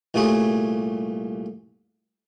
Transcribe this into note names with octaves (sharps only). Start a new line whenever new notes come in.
C2 A#2 G3 A3 G#4 C#5